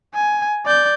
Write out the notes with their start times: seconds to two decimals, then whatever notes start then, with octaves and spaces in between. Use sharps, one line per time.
0.15 G#5
0.65 D5 G6